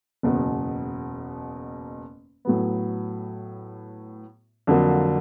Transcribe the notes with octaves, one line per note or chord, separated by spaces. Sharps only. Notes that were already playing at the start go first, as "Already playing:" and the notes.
F#1 E2 B2
A2 F#3 B3
F2 D3 F#3 A#3